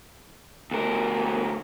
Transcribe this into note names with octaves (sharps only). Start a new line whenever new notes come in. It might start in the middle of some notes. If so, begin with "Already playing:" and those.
D2 A#4